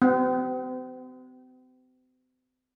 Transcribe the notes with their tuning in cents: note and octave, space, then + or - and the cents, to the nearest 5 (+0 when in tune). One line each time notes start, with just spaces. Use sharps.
C4 -40